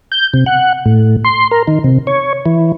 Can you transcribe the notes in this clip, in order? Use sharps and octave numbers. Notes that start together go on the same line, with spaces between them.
G6
C3
F#5
A2
C6
A#4
D#3
C3
C#5
E3